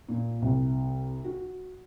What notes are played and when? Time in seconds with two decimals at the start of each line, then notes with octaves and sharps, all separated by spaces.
0.09 A#2
0.42 C2
1.24 F#4